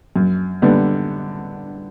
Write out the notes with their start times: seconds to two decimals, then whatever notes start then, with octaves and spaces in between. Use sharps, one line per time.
0.16 F#2
0.62 D3 G3 B3